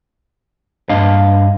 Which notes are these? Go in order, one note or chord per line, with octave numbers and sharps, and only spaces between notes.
G2 D4 D#5 F5